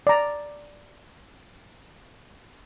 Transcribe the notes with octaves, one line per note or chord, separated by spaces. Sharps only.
D5 A#5